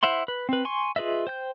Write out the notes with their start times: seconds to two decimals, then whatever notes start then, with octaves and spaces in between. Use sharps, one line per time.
0.03 E4 C5 E5 F#5 C6
0.28 B4
0.49 C4 B4
0.65 G#5 C6 C#6
0.96 F4 G#4 B4 D#5 E5
1.27 C5 G5 G6